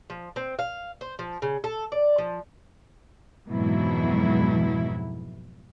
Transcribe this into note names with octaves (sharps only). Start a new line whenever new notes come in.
F3
C4
F5
C5
F3
C#3
A4
D5
F3
F2 G#2 B2 E3 F#3 E4